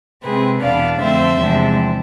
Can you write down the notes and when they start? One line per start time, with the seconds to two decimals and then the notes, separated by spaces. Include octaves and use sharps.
0.24 C3 G#3 C4 G#4 B4
0.62 E2 B2 B3 D4 D5 F5
1.00 F2 D3 A3 C4 C5 E5
1.38 E2 C3 F3 G#3 D4